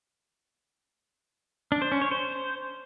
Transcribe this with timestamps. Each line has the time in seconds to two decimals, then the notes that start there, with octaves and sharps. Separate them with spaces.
1.72 D4
1.82 C5
1.92 C#4
2.02 C#5
2.11 C5